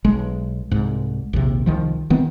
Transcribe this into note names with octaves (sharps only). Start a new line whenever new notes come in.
B1 G#3
C2 G#2
A#1 D#2 C3
C2 D#3 F3
D#3 B3 C4